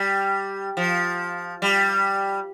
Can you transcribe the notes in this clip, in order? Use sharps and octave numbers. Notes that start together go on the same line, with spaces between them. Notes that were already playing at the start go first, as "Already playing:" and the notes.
Already playing: G3
F3
G3